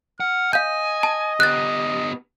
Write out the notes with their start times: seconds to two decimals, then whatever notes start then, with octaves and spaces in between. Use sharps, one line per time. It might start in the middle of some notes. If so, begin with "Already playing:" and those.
0.20 F#5 F6
0.53 D#5 F5 G#5 G6
1.03 A5
1.40 B3 G4 F#6 A6